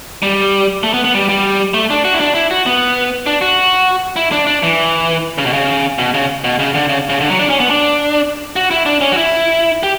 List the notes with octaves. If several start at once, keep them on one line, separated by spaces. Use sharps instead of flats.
G3
A3
B3
B3
G3
G3
A3
D4
F#4
E4
D4
E4
F#4
B3
D4
F#4
E4
D4
D4
E3
C#3
B2
C#3
B2
C#3
B2
C#3
D3
C#3
C#3
D3
F#3
D4
C#4
B3
D4
F#4
E4
D4
C#4
F#4
E4
G4